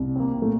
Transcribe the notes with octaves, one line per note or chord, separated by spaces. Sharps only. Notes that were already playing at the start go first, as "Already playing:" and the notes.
Already playing: C2
C4
A#3
A#2
A3